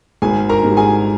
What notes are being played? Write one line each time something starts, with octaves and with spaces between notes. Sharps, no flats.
G#1 G#4 G#5
A#4 A#5
G#2 G3
G#4 G#5